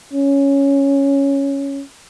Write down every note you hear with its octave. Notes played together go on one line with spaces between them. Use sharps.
C#4